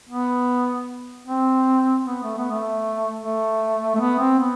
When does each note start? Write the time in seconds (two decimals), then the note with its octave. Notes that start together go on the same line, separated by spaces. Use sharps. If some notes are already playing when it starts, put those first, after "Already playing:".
0.09 B3
1.27 C4
2.05 B3
2.24 A3
2.37 B3
2.51 A3
3.21 A3
3.95 A3
4.00 B3
4.19 C4
4.39 B3